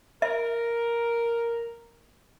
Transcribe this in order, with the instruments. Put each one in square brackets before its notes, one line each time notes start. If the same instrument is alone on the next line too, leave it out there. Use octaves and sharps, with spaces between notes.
[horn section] A#4 [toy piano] E5